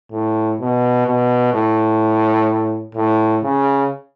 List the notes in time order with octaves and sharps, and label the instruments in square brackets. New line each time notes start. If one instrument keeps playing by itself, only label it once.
[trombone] A2
B2
B2
A2
A2
C#3